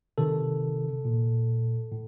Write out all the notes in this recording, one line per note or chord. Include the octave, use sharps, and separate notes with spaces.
C3 D#3 A4
A#2
A2